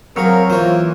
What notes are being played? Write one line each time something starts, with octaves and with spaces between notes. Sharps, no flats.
F#3 C4 G#4 A#4 C#5 F5
E3 A#3 F4 C5 C#5